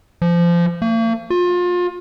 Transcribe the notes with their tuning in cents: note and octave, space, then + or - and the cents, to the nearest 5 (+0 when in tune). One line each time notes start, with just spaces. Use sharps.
F3 -25
A#3 -45
F4 +30